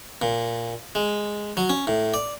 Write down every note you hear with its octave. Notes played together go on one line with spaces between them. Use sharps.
A#2
G#3
F#3
C#4
A2
D5